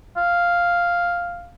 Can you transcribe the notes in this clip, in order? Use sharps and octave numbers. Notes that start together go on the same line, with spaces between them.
F5